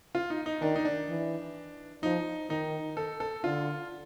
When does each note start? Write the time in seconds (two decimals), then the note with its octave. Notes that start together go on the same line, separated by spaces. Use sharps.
0.15 F4
0.30 D#4
0.46 D#4
0.62 D#3 D4
0.76 D#4
0.85 D4
1.09 E3
2.03 F3 D#4
2.49 D#3 D#4
2.97 A4
3.20 A4
3.43 D3 F4